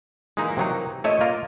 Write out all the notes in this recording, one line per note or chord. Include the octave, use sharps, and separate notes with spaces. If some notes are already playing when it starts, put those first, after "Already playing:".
A#2 E3 G#3 A#3 D#4
C3 F#3 D#4
A#2 A3 C#5 D#5 E5
A#3 F4 A#4